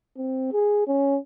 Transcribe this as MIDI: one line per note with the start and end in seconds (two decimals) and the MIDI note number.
0.18 0.51 60
0.52 0.84 68
0.87 1.17 61